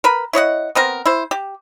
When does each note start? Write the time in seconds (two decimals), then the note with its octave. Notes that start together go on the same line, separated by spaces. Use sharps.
0.04 A#4 B4 B5
0.33 E4 C#5 D#5 F#5
0.75 B3 C4 A#4
1.06 E4 C5
1.31 G4